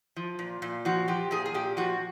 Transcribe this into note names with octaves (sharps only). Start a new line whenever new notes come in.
F3
A#2
A#2
F3 F#4
F3 G4
A#2 G#4
G#4
A#2 G4
F3 F#4